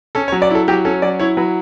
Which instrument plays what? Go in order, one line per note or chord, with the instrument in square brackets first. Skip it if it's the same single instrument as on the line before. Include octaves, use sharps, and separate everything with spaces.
[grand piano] C#4 A4
C#5
F#3
D5
E4 A4
F#3 G4
C#4 A4
F#3 D5
E4 C#5
F#3 B4